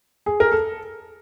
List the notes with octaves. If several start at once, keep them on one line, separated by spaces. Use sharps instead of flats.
G#4
A#4
A4